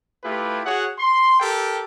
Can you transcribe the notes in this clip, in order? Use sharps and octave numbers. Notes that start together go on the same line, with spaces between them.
A3 E4 F4 G4 B4
F#4 G#4 C#5 F#5
C6
G4 A4 A#4 G5